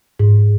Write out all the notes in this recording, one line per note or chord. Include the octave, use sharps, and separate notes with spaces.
G#2